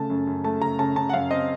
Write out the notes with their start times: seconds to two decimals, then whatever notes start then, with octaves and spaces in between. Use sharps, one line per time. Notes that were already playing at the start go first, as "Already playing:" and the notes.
Already playing: C#3 A3 A5
0.10 F#2
0.27 F#2
0.44 A3 A5
0.61 C#3 A#5
0.79 C#3 A5
0.96 C#3 A5
1.09 F#5
1.13 F#2 F5
1.31 C4 D#5